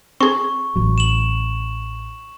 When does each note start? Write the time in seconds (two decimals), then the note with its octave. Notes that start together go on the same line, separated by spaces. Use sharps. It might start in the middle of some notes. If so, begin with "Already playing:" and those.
0.21 C4 G#4 C#6
0.76 A1 F#3
0.98 E7 F#7